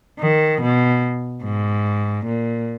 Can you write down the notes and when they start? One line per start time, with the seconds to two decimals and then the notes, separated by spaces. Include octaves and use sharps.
0.19 D#3
0.61 B2
1.43 G#2
2.25 A#2